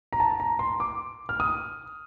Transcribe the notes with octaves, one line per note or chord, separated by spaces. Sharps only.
A#5
A5
A#5
C6
D6
F6
D#6